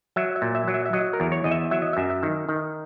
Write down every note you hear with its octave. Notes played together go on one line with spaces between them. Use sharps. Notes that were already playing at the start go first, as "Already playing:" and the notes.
F#3 E5
E5
A#2
E5
F#3
E5
E5
F#3 D#5
A#4
E2
C#5
E2 D#5
E5
F#3 E5
D#5
F#2 E5
E5
D#3
D#3